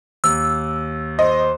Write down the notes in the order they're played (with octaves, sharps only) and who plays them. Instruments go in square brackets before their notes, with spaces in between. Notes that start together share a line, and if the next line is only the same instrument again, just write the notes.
[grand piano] D#2 [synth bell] E6
[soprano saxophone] C5 [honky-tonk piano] D#5